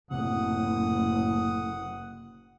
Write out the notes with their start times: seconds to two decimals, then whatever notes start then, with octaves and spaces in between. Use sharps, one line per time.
0.11 F#1 A2 C3 F#5 D#6